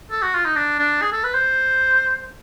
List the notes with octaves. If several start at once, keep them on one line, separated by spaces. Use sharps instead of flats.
A4
F#4
F4
D#4
D4
D4
G#4
A4
B4
C5